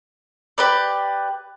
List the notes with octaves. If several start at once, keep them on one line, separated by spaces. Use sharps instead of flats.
G4 B4 D5